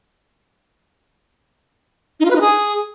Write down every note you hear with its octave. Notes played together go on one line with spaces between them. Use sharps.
D#4
F4
B4
D#4
G#4